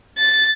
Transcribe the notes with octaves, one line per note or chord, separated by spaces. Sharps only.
A6